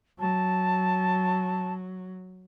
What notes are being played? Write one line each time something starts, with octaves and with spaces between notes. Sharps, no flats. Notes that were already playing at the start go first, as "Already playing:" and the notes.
F#3 A5